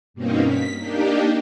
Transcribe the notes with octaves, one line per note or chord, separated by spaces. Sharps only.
G2 B2 A#3 C4 C#4 D#4
B6
A#3 D4 D#4 G4